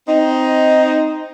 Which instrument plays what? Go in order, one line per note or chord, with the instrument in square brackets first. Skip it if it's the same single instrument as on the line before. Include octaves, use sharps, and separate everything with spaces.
[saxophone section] C4 D#4